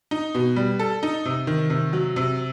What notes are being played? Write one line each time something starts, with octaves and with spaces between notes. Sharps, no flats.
D#4
B2
G3
A4
D#4
C3
D#3
C3
F#3
C3